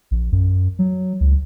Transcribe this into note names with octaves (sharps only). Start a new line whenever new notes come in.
A#1
F#2
F#3
C#2